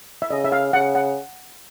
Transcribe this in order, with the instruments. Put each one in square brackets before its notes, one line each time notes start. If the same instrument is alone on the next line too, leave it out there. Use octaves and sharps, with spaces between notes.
[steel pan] E5
[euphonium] C#3 [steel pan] D#5
[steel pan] E5
F5
[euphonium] C#3 [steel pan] F#5
[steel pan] F#5